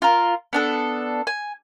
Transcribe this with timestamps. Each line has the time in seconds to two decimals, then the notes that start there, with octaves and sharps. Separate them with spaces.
0.02 F4 A#4
0.53 B3 D4 A4
1.27 G#5